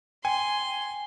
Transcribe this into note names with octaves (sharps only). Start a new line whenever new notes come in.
G5 G#5 C6